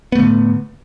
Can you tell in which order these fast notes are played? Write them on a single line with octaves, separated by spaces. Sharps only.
B3 A3 D3 A2